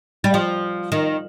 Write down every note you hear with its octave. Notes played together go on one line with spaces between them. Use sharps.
G3
F3
D#3